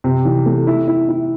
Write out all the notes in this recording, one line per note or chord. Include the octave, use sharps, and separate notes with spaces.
C3
E3
A3
E4
E4
E4